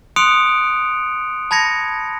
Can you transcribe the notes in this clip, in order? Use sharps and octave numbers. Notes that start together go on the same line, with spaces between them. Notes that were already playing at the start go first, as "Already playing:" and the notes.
C6 D#6 F#6 C#7 D7 F7
A5 B5 G#6 A#6 C#7